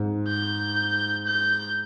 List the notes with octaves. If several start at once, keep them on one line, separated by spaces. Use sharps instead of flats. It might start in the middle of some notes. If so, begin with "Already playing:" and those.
Already playing: G#2
G6
G6